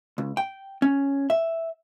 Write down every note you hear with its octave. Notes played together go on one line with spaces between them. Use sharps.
C#2
G5
C#4
E5